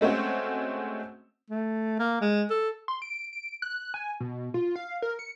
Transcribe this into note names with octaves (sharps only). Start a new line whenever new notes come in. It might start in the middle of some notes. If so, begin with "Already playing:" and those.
G#3 A3 C4 C#4 F#4
A3
A#3
G#3
A4
C6
D7
D7
F#6
G#5
B2
F4
F5
A#4
C#7